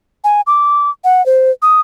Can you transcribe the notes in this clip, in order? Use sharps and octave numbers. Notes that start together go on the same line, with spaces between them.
G#5
D6
F#5
C5
D#6